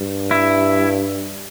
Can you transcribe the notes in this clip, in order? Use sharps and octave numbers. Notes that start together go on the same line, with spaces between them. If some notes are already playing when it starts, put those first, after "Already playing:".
Already playing: G2
E4